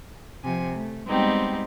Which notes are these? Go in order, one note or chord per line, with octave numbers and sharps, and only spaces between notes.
C3 F3 G#5
A3
G3 G#3 B3 C4 D#4 G4